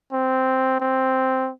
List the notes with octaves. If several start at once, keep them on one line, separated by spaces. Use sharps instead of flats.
C4
C4